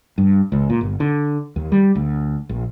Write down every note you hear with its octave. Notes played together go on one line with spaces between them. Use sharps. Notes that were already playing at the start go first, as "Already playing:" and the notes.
G2
C#2
A#2
G1
D3
D#2
G3
D2
A#1